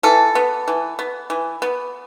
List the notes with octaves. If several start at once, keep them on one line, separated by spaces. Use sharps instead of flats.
E3 A4
B3
E3
B3
E3
B3